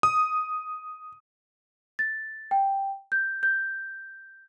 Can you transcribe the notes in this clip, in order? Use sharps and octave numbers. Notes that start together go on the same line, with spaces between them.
D#6
A6
G5
G6
G6